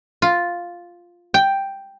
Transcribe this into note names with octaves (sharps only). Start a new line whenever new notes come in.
F4
G5